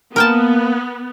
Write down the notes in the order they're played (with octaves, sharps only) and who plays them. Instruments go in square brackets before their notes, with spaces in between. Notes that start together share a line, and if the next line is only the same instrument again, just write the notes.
[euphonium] A#3 [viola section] B3 [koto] A#4 G5 A5